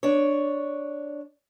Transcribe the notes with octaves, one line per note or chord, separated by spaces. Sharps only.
D4 C#5